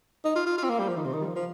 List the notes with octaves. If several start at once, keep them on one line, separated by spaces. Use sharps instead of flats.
D#4
F4
F4
F4
C4
A#3
G3
F3
D#3
C3
D#3
G3
F3
F3